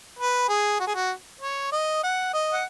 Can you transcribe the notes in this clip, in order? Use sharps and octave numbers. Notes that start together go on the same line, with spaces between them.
B4
G#4
F#4
G#4
F#4
C#5
D#5
F#5
D#5
F#5